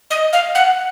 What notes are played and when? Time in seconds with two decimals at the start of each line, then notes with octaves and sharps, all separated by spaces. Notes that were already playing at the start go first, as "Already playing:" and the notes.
0.11 D#5
0.33 F5
0.55 F#5